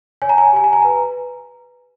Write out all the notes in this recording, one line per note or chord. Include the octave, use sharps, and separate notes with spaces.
C#5 G#5
A#5
G#5
A#5
G4 G#5
A#5
G#5
B4 A#5